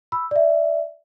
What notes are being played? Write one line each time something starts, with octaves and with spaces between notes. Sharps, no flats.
B5 E6
D5 E5